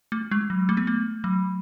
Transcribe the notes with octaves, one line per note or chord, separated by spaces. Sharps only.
A3
G#3
F#3
A3
B3
A3
F#3